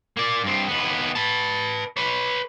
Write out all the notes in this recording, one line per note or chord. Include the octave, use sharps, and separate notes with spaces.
A#3 D5
G2 C4
D#2 B3
B4 A5
B4 C#5